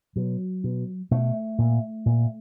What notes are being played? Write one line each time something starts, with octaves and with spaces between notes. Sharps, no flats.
B2 F#3
B2
B2 A3
A#2
A#2